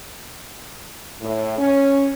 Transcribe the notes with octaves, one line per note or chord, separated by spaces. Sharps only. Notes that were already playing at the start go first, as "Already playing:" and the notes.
A2
C#4